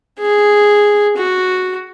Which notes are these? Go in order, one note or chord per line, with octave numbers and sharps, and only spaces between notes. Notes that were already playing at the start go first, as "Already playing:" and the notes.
G#4
F#4